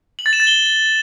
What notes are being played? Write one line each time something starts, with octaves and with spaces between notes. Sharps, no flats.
F#7
A6
E7
A6
G7